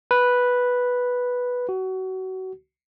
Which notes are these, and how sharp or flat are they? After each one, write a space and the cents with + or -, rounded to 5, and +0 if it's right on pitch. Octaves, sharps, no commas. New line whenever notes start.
B4 -5
F#4 +25